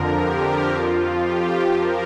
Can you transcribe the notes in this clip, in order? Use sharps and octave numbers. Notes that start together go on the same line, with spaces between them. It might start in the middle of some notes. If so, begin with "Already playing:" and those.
Already playing: F2 D3 F3 A#4
G4
F2 F3 F4
G4
F3 A#4